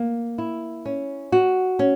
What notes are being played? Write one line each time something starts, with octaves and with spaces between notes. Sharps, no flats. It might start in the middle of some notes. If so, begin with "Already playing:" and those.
Already playing: A#3
E4
C#4
F#4
C#4